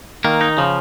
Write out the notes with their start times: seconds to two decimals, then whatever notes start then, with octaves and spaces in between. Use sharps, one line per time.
0.25 D#3 A#3
0.41 D#4
0.58 C#3 F3